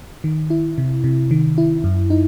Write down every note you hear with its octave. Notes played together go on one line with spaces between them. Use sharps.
D#3
E4
C3
C3
D#3
E4
F#2
D#4